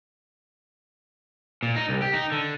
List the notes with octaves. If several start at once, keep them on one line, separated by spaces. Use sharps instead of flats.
A#2
D#4
C2
G4
D#4
D3